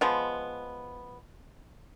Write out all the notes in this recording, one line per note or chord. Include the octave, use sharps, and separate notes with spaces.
F3 G#3 B3